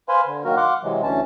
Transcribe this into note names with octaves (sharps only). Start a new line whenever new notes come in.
B4 C5 F5 G#5 B5 C6
D3
D#3 F#3 A#3 F#4 A#4
F5 F#5 C6 D6 F#6
C3 E3 F#3 G#3
D2 E3 C#4 A5